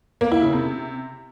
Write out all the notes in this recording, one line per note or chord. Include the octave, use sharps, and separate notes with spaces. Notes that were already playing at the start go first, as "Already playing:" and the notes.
A#3
E4
C#3
C3